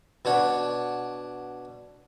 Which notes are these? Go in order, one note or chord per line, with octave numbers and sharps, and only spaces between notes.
B2 D4 C#5 F#5